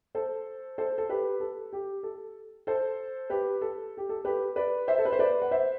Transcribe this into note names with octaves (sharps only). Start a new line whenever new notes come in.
A4 C5
A4 C5
A4
G4 B4
A4
G4
A4
A4 C5
G4 B4
A4
G4
A4
G4 B4
B4 D5
C5 E5
A4
B4
C5
B4 D5
F#5
C5 E5